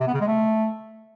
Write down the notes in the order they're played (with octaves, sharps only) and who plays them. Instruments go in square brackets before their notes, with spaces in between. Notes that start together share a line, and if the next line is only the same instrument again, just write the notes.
[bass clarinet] C3
B3
C#3
G#3
A3